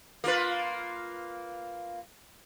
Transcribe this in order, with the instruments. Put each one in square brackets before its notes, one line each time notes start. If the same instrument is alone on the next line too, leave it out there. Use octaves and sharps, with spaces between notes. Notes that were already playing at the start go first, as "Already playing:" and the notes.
[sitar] A#3 F4 B4